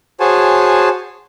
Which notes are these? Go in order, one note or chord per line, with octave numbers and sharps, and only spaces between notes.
F#4 G#4 C5 C#5 G#5 A5